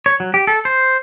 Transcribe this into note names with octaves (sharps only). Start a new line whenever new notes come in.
C#5
F#3
G4
A4
C5